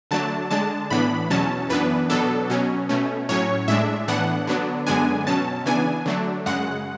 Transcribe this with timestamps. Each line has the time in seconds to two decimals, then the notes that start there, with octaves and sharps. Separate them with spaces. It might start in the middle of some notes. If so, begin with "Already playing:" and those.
0.11 D3 F#3 A3 D4 A5
0.51 D3 G#3 D4 A5
0.90 A2 E3 B3 D4 B5
1.30 E2 B2 F#3 C#4 A5
1.69 F#2 E3 B3 D4 B4
2.10 B2 F#3 B3 D4 A4
2.50 B2 F#3 C#4
2.89 B2 A3 C#4
3.29 A2 F#3 C#4 C#5
3.68 A2 G#3 D4 E5
4.08 A2 E3 B3 D4 F#5
4.47 D3 F#3 B3 D4
4.87 F#2 D3 G#3 B3 D4 G#5
5.27 B2 F#3 C#4 A5
5.66 C#3 E3 B3 D4 G#5
6.06 D3 F#3 A3 D4
6.46 F#2 C#3 G#3 F#5